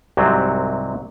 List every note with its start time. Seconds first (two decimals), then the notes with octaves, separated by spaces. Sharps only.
0.17 C2 G#2 C3 F#3 C4